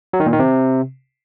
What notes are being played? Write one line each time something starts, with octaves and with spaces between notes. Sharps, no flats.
F#3
D#3
A#2
D#3
C3